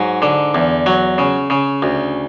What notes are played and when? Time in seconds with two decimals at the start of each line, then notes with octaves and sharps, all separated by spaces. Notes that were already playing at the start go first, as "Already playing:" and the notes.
Already playing: G#2 F#3
0.22 D3
0.55 E2
0.86 F#3
1.18 C#3
1.50 C#3
1.82 D2